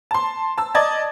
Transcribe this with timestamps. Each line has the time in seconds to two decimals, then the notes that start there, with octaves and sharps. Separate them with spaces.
0.11 A5 C6
0.58 A5 E6
0.75 D5 D#5 A5 G#6 A6